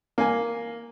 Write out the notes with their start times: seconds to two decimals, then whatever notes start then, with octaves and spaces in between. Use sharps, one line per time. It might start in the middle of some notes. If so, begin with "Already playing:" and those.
0.18 A#3 G#5